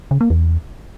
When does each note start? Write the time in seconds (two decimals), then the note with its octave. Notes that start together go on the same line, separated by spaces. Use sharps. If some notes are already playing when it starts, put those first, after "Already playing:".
0.11 C#3
0.21 A#3
0.30 E2